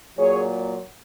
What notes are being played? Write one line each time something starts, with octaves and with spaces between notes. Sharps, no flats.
A#2 F#3 G#4 C#5